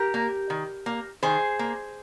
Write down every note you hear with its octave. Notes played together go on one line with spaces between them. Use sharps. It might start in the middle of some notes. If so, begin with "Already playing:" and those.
Already playing: G4 A#4
A#3
D#3
A#3
D#3 G#4 C5
A#3